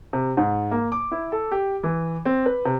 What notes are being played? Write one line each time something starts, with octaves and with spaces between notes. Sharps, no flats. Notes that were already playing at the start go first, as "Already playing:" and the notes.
C3
G#2
A#3
D6
E4
A4
G4
E3
C4
B4
C3